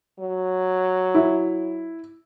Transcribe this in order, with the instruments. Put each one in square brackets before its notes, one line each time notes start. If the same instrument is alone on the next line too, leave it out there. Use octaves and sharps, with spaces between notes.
[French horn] F#3
[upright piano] E4